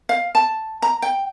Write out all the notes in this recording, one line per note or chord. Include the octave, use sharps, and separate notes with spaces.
F5
A5
A#5
G5